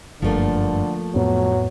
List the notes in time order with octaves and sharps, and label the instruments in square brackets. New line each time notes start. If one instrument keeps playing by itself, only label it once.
[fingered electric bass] F#1 G2 [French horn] D3 [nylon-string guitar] F3 A3 A#3
[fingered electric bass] F2 A2 B3 [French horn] F#3